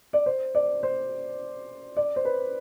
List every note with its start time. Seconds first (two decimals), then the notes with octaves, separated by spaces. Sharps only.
0.13 D5
0.26 C5
0.55 D5
0.83 C5
1.97 D5
2.16 C5
2.25 B4